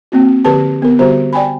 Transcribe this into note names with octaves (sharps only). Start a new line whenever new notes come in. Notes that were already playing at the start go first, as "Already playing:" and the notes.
A#3 C4 F#4
D3 F3 G4 B4 A5
B3 A#4
D3 G3 F#4 G4 C5 A#5
D5 G5 G#5 B5